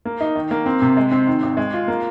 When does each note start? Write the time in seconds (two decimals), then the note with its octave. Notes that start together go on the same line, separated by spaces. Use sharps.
0.05 A#3
0.21 D#4
0.35 D#3
0.51 A#3
0.66 C4
0.82 C3
0.97 G#3
1.11 C4
1.27 D#3
1.43 G#1
1.57 G#3
1.73 F4
1.88 A#3